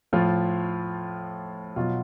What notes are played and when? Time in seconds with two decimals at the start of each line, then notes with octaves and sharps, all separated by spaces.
0.13 A2 F3 F4
1.76 B2 F#3 F4